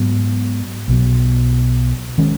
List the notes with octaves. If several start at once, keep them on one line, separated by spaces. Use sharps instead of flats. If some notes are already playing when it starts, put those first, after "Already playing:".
Already playing: G#2 F#3 B3
B1 B2 F#3
D#3 G#3 C#4